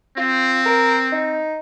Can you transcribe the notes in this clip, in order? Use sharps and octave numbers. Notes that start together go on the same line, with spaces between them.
C4 F4
A#4
D#4